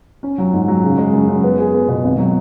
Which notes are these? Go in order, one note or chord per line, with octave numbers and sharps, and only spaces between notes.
C#4
F#3
G#2
F#3
C#3
G#3
F#2
F#2
B3
G#4
B3
B2
G#1
F#3